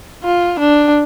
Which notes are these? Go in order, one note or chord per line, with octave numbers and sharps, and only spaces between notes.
F4
D4